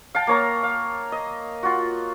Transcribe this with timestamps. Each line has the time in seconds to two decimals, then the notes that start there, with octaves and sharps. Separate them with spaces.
0.15 F5 G5 A5
0.27 A#3 C#5 A#5
0.63 F5
1.12 D#5
1.63 F4 F#4